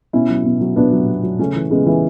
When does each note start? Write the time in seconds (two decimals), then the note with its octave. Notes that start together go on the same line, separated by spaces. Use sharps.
0.13 B2 C#4 E4
0.30 F#3
0.45 B2
0.61 F#3
0.76 B2 B3 D4
0.92 F#3
1.08 B2
1.23 F#3
1.39 C#3 A3 C#4
1.55 E3
1.71 C#3 G#3 B3
1.86 E3